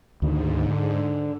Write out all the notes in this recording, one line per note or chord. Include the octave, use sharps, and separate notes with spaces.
D2 G#2 D3 D#3
D3